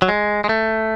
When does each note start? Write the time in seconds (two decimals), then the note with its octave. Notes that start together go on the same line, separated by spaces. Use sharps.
0.02 F#3
0.09 G#3
0.44 G#3
0.49 A3